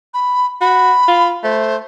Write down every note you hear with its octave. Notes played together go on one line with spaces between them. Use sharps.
B5
F#4 B5
F4
A3 C5